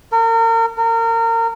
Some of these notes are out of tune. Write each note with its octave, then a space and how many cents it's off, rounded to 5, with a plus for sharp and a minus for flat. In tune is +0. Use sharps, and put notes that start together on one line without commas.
A#4 -35
A#4 -30